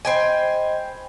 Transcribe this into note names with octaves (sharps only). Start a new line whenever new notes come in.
C5 D#5 G5 G#5 B5